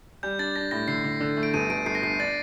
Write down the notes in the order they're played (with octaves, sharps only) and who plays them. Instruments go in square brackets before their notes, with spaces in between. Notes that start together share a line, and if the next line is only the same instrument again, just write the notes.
[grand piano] G3 [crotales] G6
[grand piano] D4 [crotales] A6
[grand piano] D4 [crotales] A#6
[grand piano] A2 [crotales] A#6
[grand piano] D3 [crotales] C7
[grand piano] D3
D3
A3
[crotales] D7
[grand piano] G1 [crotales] D#7
[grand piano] G1 [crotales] D7
[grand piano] G1 [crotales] C7
[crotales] A#6
[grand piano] G1 [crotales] C7
[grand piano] D4 [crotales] A6